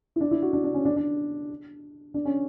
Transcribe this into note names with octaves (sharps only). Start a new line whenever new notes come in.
E4
D4
E4
F#4
D4
D4
C#4
D4
D4
D4
C#4